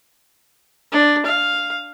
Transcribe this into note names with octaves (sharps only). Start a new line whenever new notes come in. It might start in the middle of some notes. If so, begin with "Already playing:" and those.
D4
F5